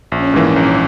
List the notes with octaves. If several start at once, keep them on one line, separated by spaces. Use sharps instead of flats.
A#1 C#4
G#2 E3 A#3
A#1 C#4